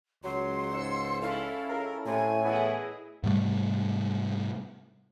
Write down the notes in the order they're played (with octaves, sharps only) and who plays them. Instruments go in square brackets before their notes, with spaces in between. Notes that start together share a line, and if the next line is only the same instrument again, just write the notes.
[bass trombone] C#2 [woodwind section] F#3 [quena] C6
[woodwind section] G#2 [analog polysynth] E6 C#7
[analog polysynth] C#4 E4 A4 [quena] F5
[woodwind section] C#2 A#4
[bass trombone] A2 [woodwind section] C3 [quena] G#5
[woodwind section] E3 B3 [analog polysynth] E4 G#4 D#5
[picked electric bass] G#2 C3 G3 A3